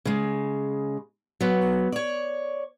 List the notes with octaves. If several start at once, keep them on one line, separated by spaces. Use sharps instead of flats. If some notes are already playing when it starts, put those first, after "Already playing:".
C#3 G#3
F#3 B3
C#5 D5